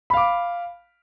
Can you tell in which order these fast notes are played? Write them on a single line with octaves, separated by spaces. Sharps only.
B5 F5 D6